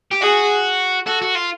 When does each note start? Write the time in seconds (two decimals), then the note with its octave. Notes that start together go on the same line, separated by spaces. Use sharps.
0.11 G4
0.22 F#4 G#4
1.06 F#4 A4
1.22 F#4
1.35 F4